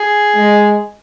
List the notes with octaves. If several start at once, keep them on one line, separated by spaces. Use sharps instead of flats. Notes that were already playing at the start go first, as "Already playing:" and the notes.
Already playing: G#4
G#3